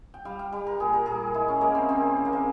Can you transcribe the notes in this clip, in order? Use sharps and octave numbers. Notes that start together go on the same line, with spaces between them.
G5
G3 F5
F5
G3
A#4
A#2 G#4
A#4
A#2 G#4
G#3 E4
C#4
G#3 A#3
C4
C#3 C4
C#3
A#3
C4